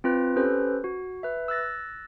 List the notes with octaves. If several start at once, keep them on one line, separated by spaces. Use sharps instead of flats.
C4 F4 B4
C#4 G4 A4 B4 C5
F#4
B4 E5
E6 F#6 A6 A#6